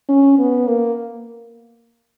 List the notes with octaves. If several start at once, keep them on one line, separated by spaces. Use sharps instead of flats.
C#4
B3
A#3